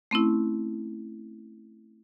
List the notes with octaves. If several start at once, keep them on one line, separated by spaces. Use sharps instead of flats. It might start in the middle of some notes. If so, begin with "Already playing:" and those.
A3 C4 C#4 E4